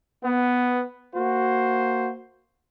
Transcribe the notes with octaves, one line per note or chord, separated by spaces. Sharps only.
B3
A#3 F#4 C5